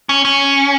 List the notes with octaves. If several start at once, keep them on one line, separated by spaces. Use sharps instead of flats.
C#4
C#4